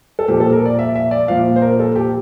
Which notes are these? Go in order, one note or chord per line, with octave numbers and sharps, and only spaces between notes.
A4
A#2 F3 G4
A4
A#4
D5
E5
E5
D5
A#2 F3 F5
C5
A#4
A4
G4